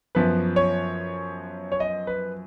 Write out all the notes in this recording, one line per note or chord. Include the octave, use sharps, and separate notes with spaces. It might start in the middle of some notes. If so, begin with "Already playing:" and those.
F#2 F3 B3 B4
C#5
C#5
D#5
B4